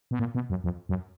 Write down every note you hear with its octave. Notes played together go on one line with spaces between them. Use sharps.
B2
A#2
B2
F#2
F2
F#2